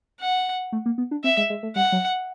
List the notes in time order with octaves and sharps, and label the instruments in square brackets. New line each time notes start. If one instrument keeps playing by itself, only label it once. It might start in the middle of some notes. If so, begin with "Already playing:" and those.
[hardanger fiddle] F#5
[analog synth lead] A3
A#3
B3
D4
[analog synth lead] C4 [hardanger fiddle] E5
[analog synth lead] G#3
G#3
A3
[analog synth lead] G3 [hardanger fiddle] F#5
[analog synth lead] F#3